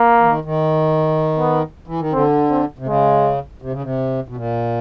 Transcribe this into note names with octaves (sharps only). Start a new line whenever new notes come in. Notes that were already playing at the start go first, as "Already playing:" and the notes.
Already playing: A#3
E3
D#3
D#3
B3
E3
D#3
D3 C4
C4
C3
C#3 G#3
C3
C#3
C3
B2
A#2